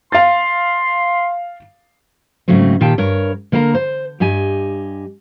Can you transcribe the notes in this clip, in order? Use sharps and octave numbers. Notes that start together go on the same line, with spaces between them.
F5 C6 A6
G#2 C#3 F#3 A3 C4
A#2 D#3 G4 F5 G5 A5
G2 A#4 C#5
D3 A#3 A#4 F5 A#5
C5
G2 G4 D#5 G#5